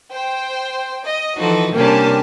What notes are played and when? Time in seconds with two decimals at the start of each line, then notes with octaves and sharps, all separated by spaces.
0.11 C5 G5
1.05 D#5
1.37 E3 F3 D#4 F#4 A4
1.75 C3 G3 A#3 C#4 D4 G4 G#5 A5